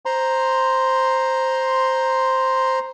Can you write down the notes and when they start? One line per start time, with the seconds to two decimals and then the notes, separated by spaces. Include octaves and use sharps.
0.06 C5 A#5 C6